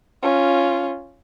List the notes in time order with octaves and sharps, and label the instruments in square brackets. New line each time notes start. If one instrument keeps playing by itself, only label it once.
[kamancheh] C#4 F4